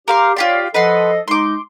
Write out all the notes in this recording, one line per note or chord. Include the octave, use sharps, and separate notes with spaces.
G4 A#4 F5 C6
F4 G4 C#5 D5 F5 C6
F3 A4 B4 D#5 F#5 C6
G#3 D#4 C6 D6